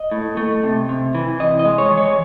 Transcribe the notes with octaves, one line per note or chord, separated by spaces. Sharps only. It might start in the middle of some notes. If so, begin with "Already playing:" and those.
Already playing: D#5
A2
A3
C3
C3
E3
C3 D#5
D#5
G#3
C#5
E3
C#5